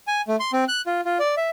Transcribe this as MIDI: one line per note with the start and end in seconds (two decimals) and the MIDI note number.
0.07 0.21 80
0.28 0.36 57
0.40 0.51 84
0.53 0.64 60
0.68 0.81 90
0.86 1.01 65
1.05 1.18 65
1.19 1.35 74
1.37 1.50 76